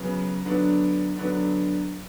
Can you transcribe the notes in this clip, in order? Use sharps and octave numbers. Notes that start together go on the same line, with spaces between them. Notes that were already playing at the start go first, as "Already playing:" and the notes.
Already playing: C#3 F#3 B3
D3 F#3 B3 D4
D3 F#3 B3 D4